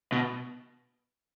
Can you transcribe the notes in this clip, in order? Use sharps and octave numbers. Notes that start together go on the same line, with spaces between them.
B2